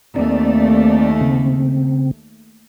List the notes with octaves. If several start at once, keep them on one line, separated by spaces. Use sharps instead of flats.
D#2 A3 C4 D5
C#3 C4